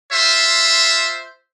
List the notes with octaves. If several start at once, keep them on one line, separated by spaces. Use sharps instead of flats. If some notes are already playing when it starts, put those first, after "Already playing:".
F4 C5 E5